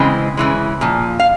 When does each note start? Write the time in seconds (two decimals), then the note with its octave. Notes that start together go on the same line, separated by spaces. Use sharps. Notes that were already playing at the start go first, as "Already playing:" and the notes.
Already playing: C#3 E3 G#3 C4
0.37 C#3 E3 G#3
0.81 A#2 F3
1.19 F5